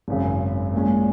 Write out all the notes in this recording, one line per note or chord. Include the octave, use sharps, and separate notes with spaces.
G#1 F#2 C#3
A#2 G#3 C#4